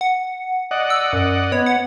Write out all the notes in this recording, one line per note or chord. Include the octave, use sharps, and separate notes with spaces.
F#5
D5 D#5 F#5
E6
F#2
B3 C#5
F#5